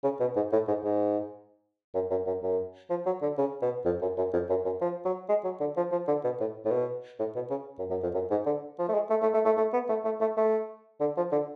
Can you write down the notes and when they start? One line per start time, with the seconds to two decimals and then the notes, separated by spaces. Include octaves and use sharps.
0.04 C#3
0.20 B2
0.36 G#2
0.52 A2
0.68 G#2
0.84 G#2
1.94 F#2
2.10 F#2
2.27 F#2
2.42 F#2
2.90 F3
3.06 F#3
3.22 D3
3.38 C#3
3.62 B2
3.85 F2
4.02 F#2
4.17 F#2
4.33 F2
4.49 F#2
4.65 F#2
4.81 F3
5.05 F#3
5.29 G#3
5.44 F#3
5.60 D3
5.77 F3
5.92 F3
6.08 D3
6.24 B2
6.40 A2
6.65 A2
6.71 B2
7.19 A2
7.35 B2
7.50 C#3
7.78 F#2
7.90 F#2
8.03 F2
8.14 F#2
8.31 G#2
8.46 D3
8.79 F3
8.89 A3
8.94 G#3
9.10 A3
9.22 A3
9.34 A3
9.45 A3
9.57 A3
9.73 B3
9.89 A3
10.05 A3
10.20 A3
10.37 A3
11.00 D3
11.17 F3
11.32 D3